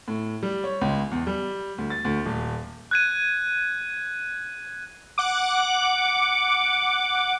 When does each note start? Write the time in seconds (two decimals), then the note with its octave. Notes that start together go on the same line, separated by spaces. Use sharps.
0.08 A2
0.43 G3
0.64 C#5
0.81 C#2
1.11 E2
1.27 G3
1.78 D2
1.90 A6
2.05 D2
2.26 D#1
2.91 F#6 G#6 D#7
5.18 F#5 D6